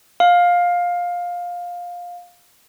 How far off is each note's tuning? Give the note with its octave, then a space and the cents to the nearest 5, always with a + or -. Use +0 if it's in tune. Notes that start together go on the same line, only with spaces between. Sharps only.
F5 +15